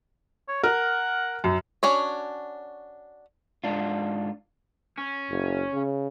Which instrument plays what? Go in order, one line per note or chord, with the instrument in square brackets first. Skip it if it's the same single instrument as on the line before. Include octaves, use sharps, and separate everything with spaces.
[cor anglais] C#5
[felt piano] A#4 [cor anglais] F#5
[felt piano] F#2
[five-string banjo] C#4 D4 F#4 C#5
[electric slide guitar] G#2 D4 F4
[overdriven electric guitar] C#4
[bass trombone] F#1
C#3